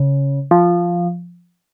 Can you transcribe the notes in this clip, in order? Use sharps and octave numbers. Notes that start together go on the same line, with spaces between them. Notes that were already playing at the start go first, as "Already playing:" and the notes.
Already playing: C#3
F3